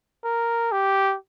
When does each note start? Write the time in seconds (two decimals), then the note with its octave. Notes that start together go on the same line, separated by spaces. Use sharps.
0.24 A#4
0.72 G4